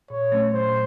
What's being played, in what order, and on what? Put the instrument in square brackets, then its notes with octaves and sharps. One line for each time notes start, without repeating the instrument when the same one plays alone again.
[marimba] A#2 [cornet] C#5
[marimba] F#3 A3 C#4
[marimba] A#2 [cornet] C5